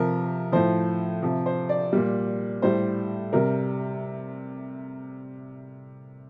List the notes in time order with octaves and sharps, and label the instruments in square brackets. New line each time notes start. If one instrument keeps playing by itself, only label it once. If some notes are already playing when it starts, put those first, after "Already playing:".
Already playing: [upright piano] C3 F3 A#4
A2 F3 C5
C3 F3
C5
D5
A#2 G3
A2 G3 C5
C3 G3 A#4